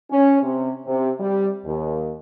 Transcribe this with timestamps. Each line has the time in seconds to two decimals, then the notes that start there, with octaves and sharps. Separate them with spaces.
0.11 C#4
0.43 C3
0.87 C3
1.20 G3
1.66 D#2